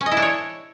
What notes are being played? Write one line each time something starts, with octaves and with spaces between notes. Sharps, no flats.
C#4
D#5
E4
D4
C#5